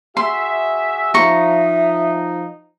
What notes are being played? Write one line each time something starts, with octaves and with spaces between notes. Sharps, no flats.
F#4 G#4 E5 C6
F3 D#4 E5 A#5 C#6